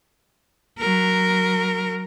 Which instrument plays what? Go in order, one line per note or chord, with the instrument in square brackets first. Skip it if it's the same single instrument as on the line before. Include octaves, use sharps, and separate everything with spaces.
[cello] F#3 A#4